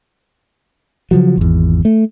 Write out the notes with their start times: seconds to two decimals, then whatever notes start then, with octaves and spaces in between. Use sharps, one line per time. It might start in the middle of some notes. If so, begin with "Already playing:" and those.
1.11 C#3 F3 F#3
1.37 G#1 E2
1.85 A3